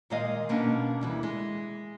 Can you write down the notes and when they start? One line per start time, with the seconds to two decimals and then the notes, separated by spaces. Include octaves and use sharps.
0.10 A#2 D#3 G#3 D#5 F5
0.49 B2 A#3 C#4 D4
1.01 D2 E3 G3
1.23 G#3